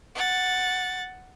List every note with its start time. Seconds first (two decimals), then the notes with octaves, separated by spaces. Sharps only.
0.15 F#5 A6